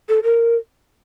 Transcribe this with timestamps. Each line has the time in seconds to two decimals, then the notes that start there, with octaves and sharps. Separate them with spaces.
0.09 A4
0.24 A#4